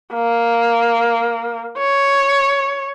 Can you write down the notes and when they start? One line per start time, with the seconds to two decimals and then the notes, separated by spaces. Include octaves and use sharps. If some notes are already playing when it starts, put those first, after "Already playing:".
0.13 A#3
1.78 C#5